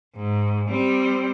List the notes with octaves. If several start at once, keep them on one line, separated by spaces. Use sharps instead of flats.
G#2
G3 C4